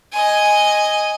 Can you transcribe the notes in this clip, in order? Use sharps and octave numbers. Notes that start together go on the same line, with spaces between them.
D#5 G#5